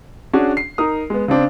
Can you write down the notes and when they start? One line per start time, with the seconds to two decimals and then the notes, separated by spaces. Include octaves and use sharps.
0.33 C#4 D4 F#4 G#4
0.57 C7
0.78 D#4 A#4 D#6
1.10 G#3 B3
1.28 C#3 C4 D4 C5